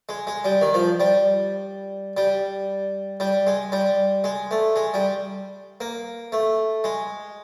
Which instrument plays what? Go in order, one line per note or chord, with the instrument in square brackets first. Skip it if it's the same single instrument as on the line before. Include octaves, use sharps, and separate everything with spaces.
[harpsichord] G#3
G#3
G3
D#3
F3
G3
G3
G3
G#3
G3
G#3
A3
G#3
G3
A#3
A3
G#3